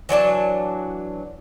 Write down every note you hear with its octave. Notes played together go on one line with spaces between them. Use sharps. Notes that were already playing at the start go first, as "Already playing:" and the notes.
E3 F#3 D4 A5